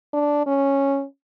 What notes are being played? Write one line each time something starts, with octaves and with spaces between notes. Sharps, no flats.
D4
C#4